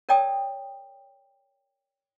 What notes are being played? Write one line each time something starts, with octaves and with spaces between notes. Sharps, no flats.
A#4 C#5 D5 G5 A5 D#6